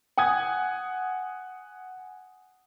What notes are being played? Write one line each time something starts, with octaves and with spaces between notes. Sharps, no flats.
F#5 G#5 D#6 G#6